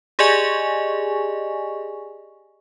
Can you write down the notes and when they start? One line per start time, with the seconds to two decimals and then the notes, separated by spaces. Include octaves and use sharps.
0.19 G4 G#4 D5 D#5 G#5 C#6